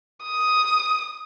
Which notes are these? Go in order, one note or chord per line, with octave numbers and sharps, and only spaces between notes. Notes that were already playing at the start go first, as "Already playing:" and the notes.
D#6